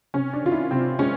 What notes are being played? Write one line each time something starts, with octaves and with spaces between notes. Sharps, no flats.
C3 C#4
D4
D#3 F4
E4
C3 C4
G#3 C#4